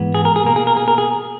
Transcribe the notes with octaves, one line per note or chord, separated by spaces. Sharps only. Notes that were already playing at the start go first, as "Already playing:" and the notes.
Already playing: G#2 E3 G#3 B3
G#4
A#4
G#4
B2 A#3 A#4
G#4
A#4
G#4
A#4
G#4